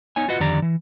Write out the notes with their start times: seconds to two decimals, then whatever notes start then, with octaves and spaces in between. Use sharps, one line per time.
0.16 B3 D#4 C#5 G#5
0.28 F4 F#4 B4 D#5 F#5
0.40 F2 D3 D#3 G4 D5 A#5
0.62 E3